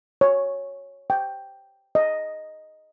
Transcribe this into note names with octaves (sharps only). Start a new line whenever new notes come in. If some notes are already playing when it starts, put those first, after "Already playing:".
C#5
G5
D#5